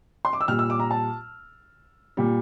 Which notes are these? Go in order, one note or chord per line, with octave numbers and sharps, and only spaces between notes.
C6
D6
E6
A#2 G3 F6
E6
D6
A#5
A5
A#2 G3